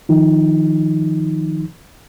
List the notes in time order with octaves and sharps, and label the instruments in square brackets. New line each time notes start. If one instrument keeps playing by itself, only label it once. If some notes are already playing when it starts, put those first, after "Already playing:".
[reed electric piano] D#3 F3 D#4